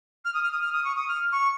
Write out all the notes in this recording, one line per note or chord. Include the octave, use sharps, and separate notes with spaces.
F6
D#6
F6
D#6
F6
D#6
C#6
D#6
F6
C#6